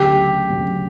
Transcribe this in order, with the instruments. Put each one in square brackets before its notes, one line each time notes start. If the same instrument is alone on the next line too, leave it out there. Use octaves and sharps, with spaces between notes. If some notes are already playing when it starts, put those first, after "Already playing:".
Already playing: [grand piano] D2 C#3 F#3 [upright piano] G4
[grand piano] D2 C#3 F#3